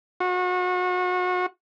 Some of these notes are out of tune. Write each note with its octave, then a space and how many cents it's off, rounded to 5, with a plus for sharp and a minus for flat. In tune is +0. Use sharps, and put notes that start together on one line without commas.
F#4 -35